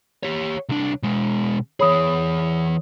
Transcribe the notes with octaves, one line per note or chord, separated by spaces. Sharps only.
G4 C#5
C2 D4
B2 G#3
E3 G#4 C#5 B5 D#6